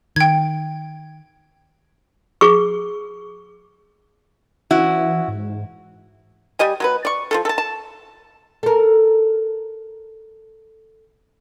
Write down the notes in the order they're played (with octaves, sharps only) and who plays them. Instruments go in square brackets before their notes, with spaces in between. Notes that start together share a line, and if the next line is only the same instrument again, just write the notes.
[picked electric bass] D#3 [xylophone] G5 G#6
[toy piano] G#4 C#6
[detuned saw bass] E3 [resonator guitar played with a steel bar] C#4 E4 F#4
[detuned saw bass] G#2
[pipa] G3 G4 D#5 G#5
F#3 B3 B4
D5 C#6
F3 B3 A4
A4 A5
A5
[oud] A4 A#4